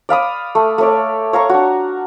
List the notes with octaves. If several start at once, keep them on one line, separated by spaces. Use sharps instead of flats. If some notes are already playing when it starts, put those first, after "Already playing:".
D5 F5 B5 D#6
A3
A3 C#5 D5
C#5 F5 A#5 C#6
D4 F#4